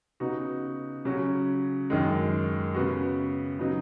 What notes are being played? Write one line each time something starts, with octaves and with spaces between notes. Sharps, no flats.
C#3 B3 D#4 F#4
C#3 F#3 C#4 F#4
F#2 D#3 G#3
C#3 B3 F#4
C#3 F#3 B3 D#4